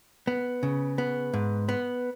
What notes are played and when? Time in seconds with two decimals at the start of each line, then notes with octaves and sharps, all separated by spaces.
0.27 B3
0.63 C#3
0.98 B3
1.33 G#2
1.69 B3